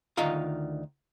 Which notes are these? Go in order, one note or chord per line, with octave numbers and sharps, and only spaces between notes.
D2 D#3 F4 D#5 F5 A#5